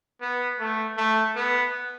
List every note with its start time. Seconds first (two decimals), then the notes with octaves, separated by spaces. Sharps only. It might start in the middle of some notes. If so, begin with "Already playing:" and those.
0.21 B3
0.60 A3
0.97 A3
1.36 B3